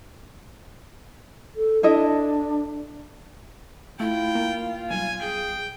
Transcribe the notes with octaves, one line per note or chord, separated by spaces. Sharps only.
A4
D4 E4 A4 D#5
A3 E4 F4 G5
A#3
B1 G3 G#5
G#4 G5